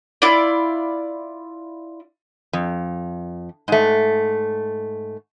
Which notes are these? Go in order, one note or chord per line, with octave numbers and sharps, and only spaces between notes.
E4 F4 D5
F2
G#2 A3